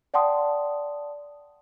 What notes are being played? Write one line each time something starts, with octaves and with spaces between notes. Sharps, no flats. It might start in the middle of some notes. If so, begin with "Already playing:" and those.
D5 F#5 G5 A5 C6 D#6